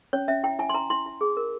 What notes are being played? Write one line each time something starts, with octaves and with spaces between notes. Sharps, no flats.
C#4 C#5
C#4 E5
E4 G5
E4 G#5
C6
E4 A#5
E4 C6
E4
G#4
A#4